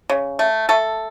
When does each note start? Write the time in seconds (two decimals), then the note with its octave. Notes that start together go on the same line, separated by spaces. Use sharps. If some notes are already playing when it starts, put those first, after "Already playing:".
0.10 C#3
0.39 A3
0.69 A3 A4